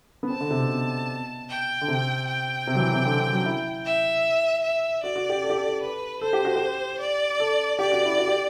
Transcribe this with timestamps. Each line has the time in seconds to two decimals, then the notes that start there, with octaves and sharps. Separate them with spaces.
0.23 B3
0.30 C4 A5
0.41 D3
0.50 C3
0.59 B2
0.70 B2
1.49 G5
1.81 D3
1.88 C3
2.27 G5
2.67 C3
2.75 F#3
2.80 E3
2.93 C3
3.06 D3
3.19 D3
3.33 F#3
3.46 E4
3.86 E5
4.64 E5
5.03 F#4 D5
5.16 F#4
5.30 G4
5.42 A4
5.50 G4
5.57 A4
5.82 B4
6.21 A4 C5
6.33 G4
6.45 F#4
6.56 G4
7.00 D5
7.40 A4
7.79 G4 D5
7.92 F#4
8.05 E4
8.18 F#4
8.28 G4